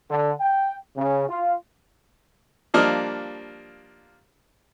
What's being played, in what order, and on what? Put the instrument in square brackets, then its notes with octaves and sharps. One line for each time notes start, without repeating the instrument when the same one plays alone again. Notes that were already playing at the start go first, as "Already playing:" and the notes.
[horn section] D3
G5
C#3
F4
[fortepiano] F3 G3 A#3 D4 D#5 F6